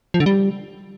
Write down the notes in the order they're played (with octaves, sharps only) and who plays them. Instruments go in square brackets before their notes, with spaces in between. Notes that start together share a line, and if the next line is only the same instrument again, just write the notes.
[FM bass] F3
D3
G3